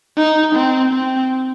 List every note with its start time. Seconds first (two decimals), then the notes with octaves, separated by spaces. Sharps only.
0.17 D#4
0.55 C4
0.94 C4